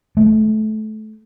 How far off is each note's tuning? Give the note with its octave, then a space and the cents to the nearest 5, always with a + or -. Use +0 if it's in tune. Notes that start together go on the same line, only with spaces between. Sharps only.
A3 -25